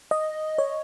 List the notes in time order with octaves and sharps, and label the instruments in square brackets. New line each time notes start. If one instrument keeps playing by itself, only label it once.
[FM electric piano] D#5
C#5